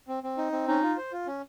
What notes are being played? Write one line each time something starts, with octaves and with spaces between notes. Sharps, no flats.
C4
C4
D#4
C4
C#4 D#4
F4
C5
F4
C#4